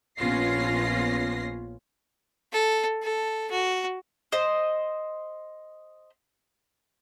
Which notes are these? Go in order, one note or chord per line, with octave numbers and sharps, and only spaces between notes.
A#1 B3 C#4 F4 A#6 C7
A4
A4
F#4
C5 D#5